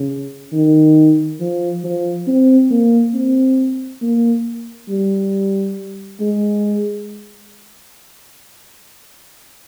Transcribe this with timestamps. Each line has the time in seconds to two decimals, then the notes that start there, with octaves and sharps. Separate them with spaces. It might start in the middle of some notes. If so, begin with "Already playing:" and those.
Already playing: C#3
0.52 D#3
1.40 F3
1.84 F3
2.27 C4
2.71 A#3
3.14 C4
4.02 A#3
4.89 G3
6.20 G#3